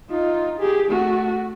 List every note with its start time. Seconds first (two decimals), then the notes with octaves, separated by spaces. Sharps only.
0.10 D#4 F4
0.60 G4 G#4
0.89 A3 F#4